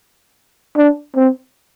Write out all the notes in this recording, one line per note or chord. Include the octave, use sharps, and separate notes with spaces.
D4
C4